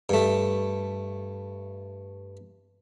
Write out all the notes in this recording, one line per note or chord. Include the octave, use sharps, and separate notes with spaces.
G2 A3